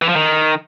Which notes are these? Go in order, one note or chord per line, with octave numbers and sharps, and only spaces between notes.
E3
F3
D#3